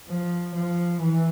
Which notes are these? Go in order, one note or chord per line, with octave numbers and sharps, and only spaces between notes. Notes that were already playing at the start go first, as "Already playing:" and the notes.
F3
F3
E3